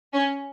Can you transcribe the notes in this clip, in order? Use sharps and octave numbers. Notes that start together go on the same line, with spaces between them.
C#4